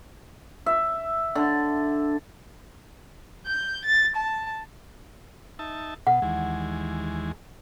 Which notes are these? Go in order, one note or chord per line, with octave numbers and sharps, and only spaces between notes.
E5
D3
G6
A6
A5
D#4 E5 A5
B2 F#5
D#2 E3 G#3